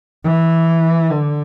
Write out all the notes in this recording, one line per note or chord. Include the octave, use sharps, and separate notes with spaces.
E3
D3